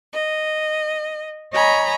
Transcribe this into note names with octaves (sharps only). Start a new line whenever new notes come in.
D#5
C#5 D#5 G#5 A#5 B5